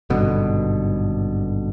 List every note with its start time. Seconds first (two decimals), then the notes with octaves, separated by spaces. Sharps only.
0.10 G#1 G2 B2 D3